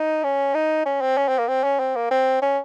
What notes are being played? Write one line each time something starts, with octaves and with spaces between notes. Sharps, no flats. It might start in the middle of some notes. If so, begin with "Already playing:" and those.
Already playing: D#4
C#4
D#4
C#4
C4
C#4
C4
A#3
C4
C#4
C4
A#3
C4
C#4